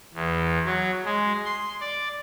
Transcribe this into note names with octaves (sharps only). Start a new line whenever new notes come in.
E2
F#3
G#3
C6
D5